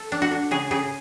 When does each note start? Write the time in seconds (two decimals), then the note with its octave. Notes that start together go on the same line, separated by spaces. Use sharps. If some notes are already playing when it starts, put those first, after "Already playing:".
Already playing: A4
0.12 D4
0.22 F#4
0.31 D4
0.51 C#3 G#4
0.71 C#3 G#4